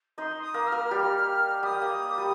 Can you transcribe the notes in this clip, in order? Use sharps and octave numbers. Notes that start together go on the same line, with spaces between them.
D#4 D#5 C6
D#6
A#3 A#4
F6
A#3 A#4
G3 G4
G3 G4 D#6
A#3
G3